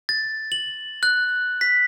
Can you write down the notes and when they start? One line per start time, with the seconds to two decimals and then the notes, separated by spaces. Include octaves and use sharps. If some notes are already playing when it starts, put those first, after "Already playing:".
0.09 A6
0.52 F#7
1.03 F#6
1.61 B6